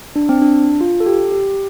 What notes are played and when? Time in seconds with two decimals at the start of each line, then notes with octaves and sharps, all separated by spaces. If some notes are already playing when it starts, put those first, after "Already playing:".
0.16 D4
0.29 C4
0.42 D4
0.81 F4
1.00 A4
1.06 G4
1.32 G4